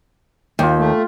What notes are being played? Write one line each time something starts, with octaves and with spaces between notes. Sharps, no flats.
D#2 F4 G5
A3